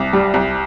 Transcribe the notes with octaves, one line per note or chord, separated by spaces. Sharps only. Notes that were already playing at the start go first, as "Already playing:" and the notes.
Already playing: C2
G3
C2